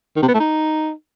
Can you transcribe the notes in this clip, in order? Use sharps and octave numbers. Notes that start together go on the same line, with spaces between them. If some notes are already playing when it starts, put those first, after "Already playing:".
D#3
C3
B3
A3
D#4